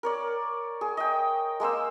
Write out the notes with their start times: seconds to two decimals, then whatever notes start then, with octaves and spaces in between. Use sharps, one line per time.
0.03 A#4 C#5 D5
0.81 G#4
0.97 D#5 G5
1.60 G#3 A#3 C5 E6